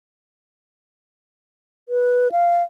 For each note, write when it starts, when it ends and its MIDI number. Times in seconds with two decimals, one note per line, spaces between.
1.89 2.31 71
2.32 2.63 77